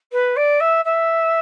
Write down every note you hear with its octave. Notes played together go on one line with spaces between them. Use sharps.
B4
D5
E5
E5